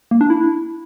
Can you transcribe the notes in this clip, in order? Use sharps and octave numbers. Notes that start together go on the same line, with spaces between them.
A#3
D4
E4